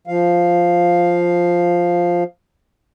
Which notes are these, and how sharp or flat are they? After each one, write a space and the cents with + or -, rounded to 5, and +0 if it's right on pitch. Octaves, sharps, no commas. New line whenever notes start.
F3 +0 F5 +0